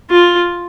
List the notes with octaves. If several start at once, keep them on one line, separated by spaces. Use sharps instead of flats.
F4